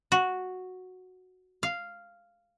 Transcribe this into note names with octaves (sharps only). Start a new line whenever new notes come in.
F#4
F5